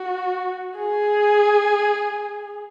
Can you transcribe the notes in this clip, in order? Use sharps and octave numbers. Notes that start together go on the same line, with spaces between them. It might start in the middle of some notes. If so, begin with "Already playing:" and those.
Already playing: F#4
G#4